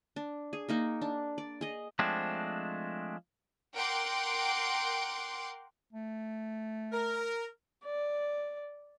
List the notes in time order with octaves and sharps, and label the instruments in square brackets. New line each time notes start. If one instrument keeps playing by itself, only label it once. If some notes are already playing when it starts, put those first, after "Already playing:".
[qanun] D4
G#4
A#3 D#4 A#4
D4
D5
G#4 D#5
[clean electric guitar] F3 G#3 A3 C4 D4
[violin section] A#4 F#5 G5 C6 D6 D7
[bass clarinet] A3
[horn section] A#4
[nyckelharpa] D5